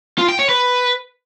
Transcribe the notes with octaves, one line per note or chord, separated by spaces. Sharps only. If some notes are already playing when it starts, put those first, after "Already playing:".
F4
G5
C#5
B4